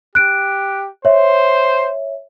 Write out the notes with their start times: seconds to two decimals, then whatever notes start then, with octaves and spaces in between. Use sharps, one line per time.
0.15 G4 F#6 D7
1.05 C5 C#5 E5